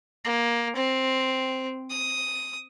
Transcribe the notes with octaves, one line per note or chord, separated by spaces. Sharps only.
A#3
C4
D#6